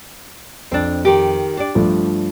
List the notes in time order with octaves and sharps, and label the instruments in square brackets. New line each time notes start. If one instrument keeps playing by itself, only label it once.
[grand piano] F2 [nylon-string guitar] C4 D4
[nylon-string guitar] D#3 G4
[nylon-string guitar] D4 D5 [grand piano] G4
[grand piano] G2 F3 A3